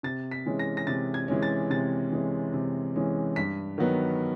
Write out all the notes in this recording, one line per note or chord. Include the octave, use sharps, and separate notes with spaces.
C3 A6
B6
E3 G#3 C#4
A#6
A#6
C3 A6
G#6
E3 G#3 C#4
A6
C3 A6
E3 G#3 C#4
C3
E3 G#3 C#4
G2 B6
D#3 F#3 B3